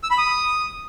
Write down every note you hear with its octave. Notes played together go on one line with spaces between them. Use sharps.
E6
B5
D#6